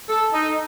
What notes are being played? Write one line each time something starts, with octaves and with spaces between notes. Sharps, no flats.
A4
D#4